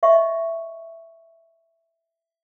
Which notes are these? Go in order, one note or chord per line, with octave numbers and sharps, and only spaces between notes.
D#5 E5 C#6